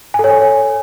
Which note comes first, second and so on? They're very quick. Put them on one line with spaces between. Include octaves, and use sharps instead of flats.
G#5 A4 C#5